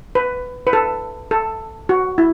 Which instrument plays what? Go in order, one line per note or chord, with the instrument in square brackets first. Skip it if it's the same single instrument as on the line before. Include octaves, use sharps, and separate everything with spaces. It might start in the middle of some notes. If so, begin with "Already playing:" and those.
[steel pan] B4
B4
A4
A4
F#4
E4